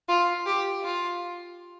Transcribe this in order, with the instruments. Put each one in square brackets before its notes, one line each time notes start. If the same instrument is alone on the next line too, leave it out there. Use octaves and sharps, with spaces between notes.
[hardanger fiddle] F4
G4
F4